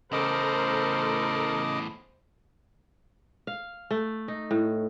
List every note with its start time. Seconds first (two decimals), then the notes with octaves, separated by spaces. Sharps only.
0.12 E2 A2 C#3 A4 A#4 C5 D#5 D6
3.47 F5
3.91 A3
4.28 D#4
4.51 A2